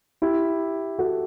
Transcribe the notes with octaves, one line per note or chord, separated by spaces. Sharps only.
E4 G4
F#4 A4